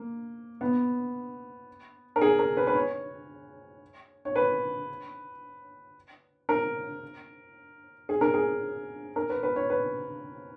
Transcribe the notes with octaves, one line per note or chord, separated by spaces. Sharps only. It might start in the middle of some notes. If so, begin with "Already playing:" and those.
Already playing: A#3
B3
A#4
G#4
A#4
B4
B4
C#5
C#5
B4
A#4
G#4
A#4
G#4
A#4
B4
B4
C#5
B4